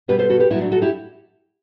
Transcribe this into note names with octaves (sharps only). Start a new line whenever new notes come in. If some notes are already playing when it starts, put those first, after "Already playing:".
B2 G3 B3 G4 B4
A4 C5
F#4 A4
G4 B4
A2 F#3 B3 E4
D4 F#4
F#4 A4
E4 G4